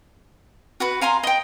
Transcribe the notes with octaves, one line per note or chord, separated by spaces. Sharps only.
F#4 B4 B5
F5 G#5 A#5 C6
D#5 G5